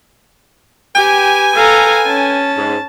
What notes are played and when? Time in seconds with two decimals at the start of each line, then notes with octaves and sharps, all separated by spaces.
0.96 G4 B4 G5 G#5
1.56 A4 F5 A#5
2.06 C#4 A5
2.57 G#2